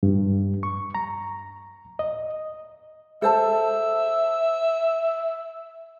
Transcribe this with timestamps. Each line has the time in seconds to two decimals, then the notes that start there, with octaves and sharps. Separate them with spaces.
0.03 G2
0.63 C#6
0.95 A#5
1.99 D#5
3.22 A4 C5 E5 A5